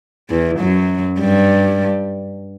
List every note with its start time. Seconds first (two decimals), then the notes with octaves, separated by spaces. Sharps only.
0.30 E2 E3
0.59 F#2 F#3
1.20 G2 G3